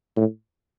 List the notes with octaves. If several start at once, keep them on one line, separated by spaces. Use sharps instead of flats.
A2